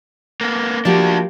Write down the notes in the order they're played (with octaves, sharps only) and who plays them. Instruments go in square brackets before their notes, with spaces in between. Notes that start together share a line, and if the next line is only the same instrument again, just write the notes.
[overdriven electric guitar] A#3 B3
[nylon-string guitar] F3 A#3 G4 [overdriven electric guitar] D4 F#4